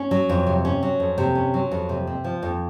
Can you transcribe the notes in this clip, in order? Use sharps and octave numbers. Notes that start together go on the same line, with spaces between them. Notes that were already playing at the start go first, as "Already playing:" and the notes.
Already playing: C#4
F#3
F2
C3
C#4
F#3
F2
C3
C#4
F#3
F2
C3
C4
F3
F2